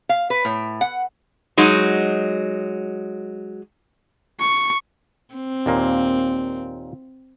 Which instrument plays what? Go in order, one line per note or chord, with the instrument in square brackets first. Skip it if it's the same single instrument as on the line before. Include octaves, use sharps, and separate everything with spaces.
[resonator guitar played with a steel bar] F5
B4
A2
F#5
F#3 G#3 D#4
[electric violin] C#6
[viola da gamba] C4
[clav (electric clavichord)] D#2 A#2 A#3